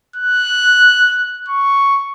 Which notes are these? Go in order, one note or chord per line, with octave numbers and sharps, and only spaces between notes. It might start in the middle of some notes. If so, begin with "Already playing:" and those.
F#6
C#6